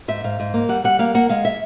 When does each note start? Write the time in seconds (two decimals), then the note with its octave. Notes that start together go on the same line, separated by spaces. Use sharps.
0.08 G#2 E5
0.24 G#2 F5
0.40 G#2
0.54 A#3
0.69 G3 F#5
0.84 G3 F#5
0.99 A#3 F5
1.14 A#3 F#5
1.29 G#3 F5
1.45 E5